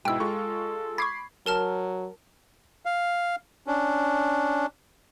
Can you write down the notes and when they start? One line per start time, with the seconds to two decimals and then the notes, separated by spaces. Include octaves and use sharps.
0.05 G#2 B2 E4 G5 E6
0.20 G#3 F4 A4 C#6
0.98 B5 C#6 D6 G#6 C7
1.46 F#3 A#4 A5 F6
2.85 F5
3.67 C#4 D4